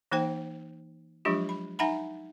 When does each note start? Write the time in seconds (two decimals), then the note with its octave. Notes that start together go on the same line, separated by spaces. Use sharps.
0.12 E3 A#3 D#4 C5 G5
1.25 F3 F#3 G#3 D4 F4 G4
1.49 B5
1.79 D#4 E5 F#5 G#5 A#5 B5